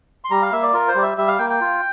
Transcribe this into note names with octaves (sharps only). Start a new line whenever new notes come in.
C6
G3 A#5
F5
A#3 E5
D5
F4 A#4
C5
G3 D5
E5
G3 E5
F5
A#3 G5
G5
F4